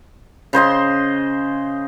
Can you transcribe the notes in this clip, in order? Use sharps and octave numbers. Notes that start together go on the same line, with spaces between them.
C#3 C5 D#5 C6